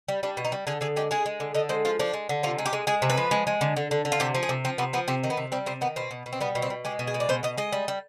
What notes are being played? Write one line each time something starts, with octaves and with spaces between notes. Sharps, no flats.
G3
G3 D4
B2
D#4
G3
D3 G#4
D3 G#4
G#3 G4
G#3 G#4
G#3
D3
D3 D#5
G#3 C5
F3 F4
F3 D4
G#3
D3
C3 F4
G#3
G4
G#3
G#3 G#4
C3
B4
F3
G#3
G#3
D3
D3
D3
D3
F4
C3 G4
F3
G#4
C3
F3 C4
C3 B3
F3 B3
C3 C4
D#3
B3
C3
G3 C4
C3 C4
D#3 B3
B2 C4
B2
B2
C4
G3 B3
B2
C4
B2
G#3 G4
B2
G#4
G#3
D5
B2 C5
B2 D#5
G#3 D#5
G3
G3